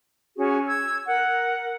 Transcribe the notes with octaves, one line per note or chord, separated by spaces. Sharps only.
C#4 F#4 G#4
E6 G#6
A#4 F#5